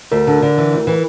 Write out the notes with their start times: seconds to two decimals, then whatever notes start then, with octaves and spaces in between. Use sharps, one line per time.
0.11 D2 A#4
0.27 D3
0.42 D3
0.57 E3
0.73 D2
0.87 E3